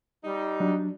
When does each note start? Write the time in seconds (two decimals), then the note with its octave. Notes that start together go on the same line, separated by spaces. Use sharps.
0.24 G3 D#4
0.60 F#3 D4